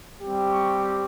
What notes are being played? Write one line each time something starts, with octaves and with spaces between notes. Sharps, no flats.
G3 C4 G4
C#6